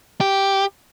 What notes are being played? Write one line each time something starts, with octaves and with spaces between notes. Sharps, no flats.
G4